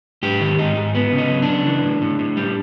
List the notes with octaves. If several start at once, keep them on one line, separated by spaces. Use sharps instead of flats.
G#2 G4
D#3
G#2 D#4
G#2
B3
C#3
D#4
F#3
D4
C#3
E3
A2
A2
A2
G3